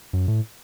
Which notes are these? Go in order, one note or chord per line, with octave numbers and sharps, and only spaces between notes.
F#2
A2